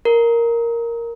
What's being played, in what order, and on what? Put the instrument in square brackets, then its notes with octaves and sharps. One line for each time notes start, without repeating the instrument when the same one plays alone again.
[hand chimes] A#4